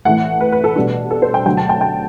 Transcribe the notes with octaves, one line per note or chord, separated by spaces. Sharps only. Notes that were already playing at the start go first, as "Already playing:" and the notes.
A2 E3 A3 F#5
B4
B4
A4
B2 G3 D4
A4
C5
G5
D2 D3 F#3 G5
A5
G5
G5